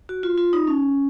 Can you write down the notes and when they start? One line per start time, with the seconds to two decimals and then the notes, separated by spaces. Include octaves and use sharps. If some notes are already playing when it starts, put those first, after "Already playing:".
0.09 F#4
0.23 F4
0.38 F4
0.53 D#4
0.67 C#4